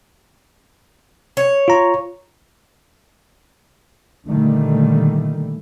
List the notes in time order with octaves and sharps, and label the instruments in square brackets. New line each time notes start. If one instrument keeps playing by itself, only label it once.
[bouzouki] C#5
[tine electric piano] F4 A#5
[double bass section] A#2 D3 D#3 G3 A3